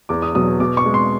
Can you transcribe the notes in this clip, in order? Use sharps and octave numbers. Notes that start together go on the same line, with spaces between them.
E2 D6
D#6
B2 F#3 D#6
B2 D6
C#6
G#3
C6